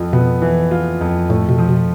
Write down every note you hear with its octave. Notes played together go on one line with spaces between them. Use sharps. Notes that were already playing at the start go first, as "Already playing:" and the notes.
Already playing: F2 F4
B2 B3
E3
F4
F2
A2 A3
B2
F3
B2